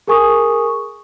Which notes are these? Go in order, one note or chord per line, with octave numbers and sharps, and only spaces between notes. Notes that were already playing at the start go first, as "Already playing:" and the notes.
G#4 A#4 G#5 C#6 D#6